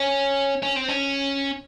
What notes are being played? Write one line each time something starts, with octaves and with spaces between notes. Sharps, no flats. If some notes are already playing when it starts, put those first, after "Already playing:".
Already playing: C#4
C#4
C4
C#4